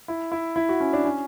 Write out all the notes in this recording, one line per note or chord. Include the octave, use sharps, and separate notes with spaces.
E4
E4
E4
F#4
C#4
D4
C#4